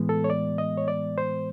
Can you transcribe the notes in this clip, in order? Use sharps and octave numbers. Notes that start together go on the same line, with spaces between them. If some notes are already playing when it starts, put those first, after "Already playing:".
Already playing: A2 E3 G#3 B3
A4
C#5
D5
D#5
C#5
D5
C5